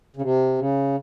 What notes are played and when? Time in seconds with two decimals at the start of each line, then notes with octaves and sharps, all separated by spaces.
0.17 C#3
0.22 C3
0.58 C#3